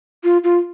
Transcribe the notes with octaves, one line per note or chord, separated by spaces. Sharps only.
F4
F4